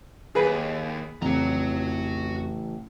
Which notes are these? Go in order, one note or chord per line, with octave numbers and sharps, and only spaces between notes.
D#2 G#4 B4
A1 F2 C#3 E3 F#4 A#5